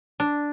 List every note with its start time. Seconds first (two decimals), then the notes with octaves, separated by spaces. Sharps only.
0.20 D4